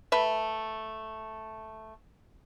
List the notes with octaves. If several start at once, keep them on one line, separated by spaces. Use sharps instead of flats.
A3 B4 E5